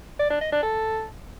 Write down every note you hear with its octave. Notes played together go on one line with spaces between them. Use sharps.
D5
D4
D#5
D4
A4